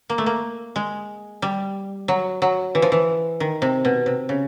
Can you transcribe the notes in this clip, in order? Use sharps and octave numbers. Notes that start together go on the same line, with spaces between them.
A#3
A3
A#3
G#3
G3
F#3
F#3
E3
F3
E3
D#3
C3
B2
C3
C#3